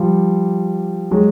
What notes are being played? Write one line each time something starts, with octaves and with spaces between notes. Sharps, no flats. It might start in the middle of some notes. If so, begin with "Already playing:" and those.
Already playing: F3 G3
F#3 G#3